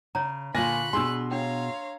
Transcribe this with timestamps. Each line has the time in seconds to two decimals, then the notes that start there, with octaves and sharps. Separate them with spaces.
0.15 C#3 C#5 A#5
0.55 A#2 D3 F4 G#5 B5 C#6 F#6 A#6
0.93 B2 D4 G4 G#4 G#5 C6 E6
1.31 D4 C#5 F5 G5 A#5